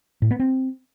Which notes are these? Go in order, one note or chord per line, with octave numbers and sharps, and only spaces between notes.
A2
B3
C4